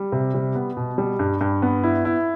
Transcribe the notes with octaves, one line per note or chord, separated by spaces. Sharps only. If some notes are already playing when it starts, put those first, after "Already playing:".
Already playing: G3
C3
G3
B3
B2
G3
G2
G2
B3
E4
E4